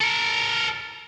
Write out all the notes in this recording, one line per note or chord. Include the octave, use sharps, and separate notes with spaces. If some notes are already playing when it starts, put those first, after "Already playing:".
A4 A#4